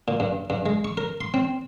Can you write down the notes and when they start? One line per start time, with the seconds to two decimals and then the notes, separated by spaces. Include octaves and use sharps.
0.08 A#2
0.20 G2
0.50 G2
0.66 G#3
0.85 C#6
0.97 A#4
1.21 C6
1.34 C4